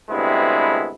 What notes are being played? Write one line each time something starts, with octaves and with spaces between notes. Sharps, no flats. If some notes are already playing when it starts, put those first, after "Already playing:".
D2 G2 C3 G#3 B3 E4